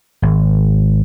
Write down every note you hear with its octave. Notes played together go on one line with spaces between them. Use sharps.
G#1